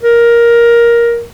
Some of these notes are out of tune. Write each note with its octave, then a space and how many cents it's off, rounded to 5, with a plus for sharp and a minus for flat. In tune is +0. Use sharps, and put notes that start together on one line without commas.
A#4 +10